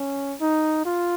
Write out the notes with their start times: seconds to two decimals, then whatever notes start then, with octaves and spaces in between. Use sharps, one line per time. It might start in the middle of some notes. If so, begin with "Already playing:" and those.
Already playing: C#4
0.40 D#4
0.85 F4